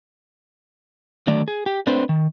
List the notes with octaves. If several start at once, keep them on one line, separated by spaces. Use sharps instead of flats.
D3 D#3 F#3 A3 D5
G#4
G4
A3 C4 D4 B4 C5
D#3